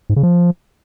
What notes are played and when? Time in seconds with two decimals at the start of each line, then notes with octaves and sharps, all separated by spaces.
0.10 G#2
0.16 C#3
0.23 F3